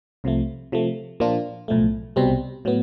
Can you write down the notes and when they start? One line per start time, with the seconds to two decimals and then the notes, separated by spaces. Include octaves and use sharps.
0.24 C2 C3 F3 A3
0.72 C3 F3 A3
1.20 A#2 F3 A#3 D4 F4
1.68 B1 A2 F3 A3
2.16 C2 B2 G3 C4
2.65 A2 F#3 B3